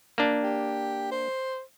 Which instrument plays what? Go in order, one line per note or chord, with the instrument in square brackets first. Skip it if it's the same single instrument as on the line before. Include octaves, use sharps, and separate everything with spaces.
[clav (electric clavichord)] A#3 D4
[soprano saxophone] G4
C5